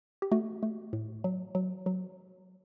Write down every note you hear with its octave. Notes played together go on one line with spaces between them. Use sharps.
G4
A3 F#4
A3
A2
F#3
F#3
F#3